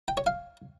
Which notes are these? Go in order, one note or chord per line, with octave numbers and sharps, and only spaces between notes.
G5
C#5
F5